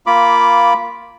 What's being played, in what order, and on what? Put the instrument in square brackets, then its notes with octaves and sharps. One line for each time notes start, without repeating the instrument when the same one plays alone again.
[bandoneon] A#3 F4 B5 D6